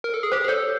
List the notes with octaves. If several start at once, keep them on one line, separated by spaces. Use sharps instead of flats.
A#4
A4
G#4
G4 C5
G#4
A4 C#5